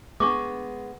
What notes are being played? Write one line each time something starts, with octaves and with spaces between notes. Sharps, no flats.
G#3 B3 D4 C#6 D6